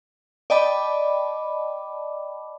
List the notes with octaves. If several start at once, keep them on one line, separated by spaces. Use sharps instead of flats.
D5 D#5 G5 A5 B5 D6